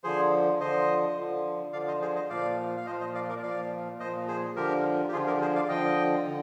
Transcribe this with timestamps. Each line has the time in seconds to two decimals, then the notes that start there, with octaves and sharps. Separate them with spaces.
0.04 D3 F3 G#4 C5
0.60 D3 F3 C5 D#5
1.17 D3 F3
1.73 D3 F3 D5 F5
1.88 C5 D#5
2.01 G#4 C5
2.16 C5 D#5
2.29 A#2 F3 D5 F5
2.77 F5
2.86 F3 C5 D#5
2.89 A#2
3.00 C5 D#5
3.14 D5 F5
3.29 A#4 D5
3.43 A#2 F3 D5 F5
3.99 A#2 C5 D#5
4.04 F3
4.28 G#4 C5
4.56 D3 F3 G4 A#4
5.09 G4
5.12 D3 F3 F4 G#4
5.27 G4 A#4
5.41 G#4 C5
5.55 D5 F5
5.69 D3 F3 D#5 G5
6.26 D3